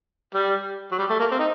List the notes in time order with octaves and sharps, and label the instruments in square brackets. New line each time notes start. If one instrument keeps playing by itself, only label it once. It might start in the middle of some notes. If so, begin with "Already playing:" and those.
[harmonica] G3
F#3
G3
A3
A#3
C4
D#4